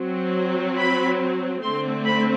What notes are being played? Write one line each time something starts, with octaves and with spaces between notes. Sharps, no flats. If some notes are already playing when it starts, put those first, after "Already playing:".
Already playing: F#3 C4
B5
D3 A3 C4 C6
B5